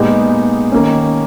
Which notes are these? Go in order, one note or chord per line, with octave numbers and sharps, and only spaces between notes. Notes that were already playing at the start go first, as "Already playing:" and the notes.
Already playing: A#2 G#3 B3 D#4 G4
D#3 A#3 C#4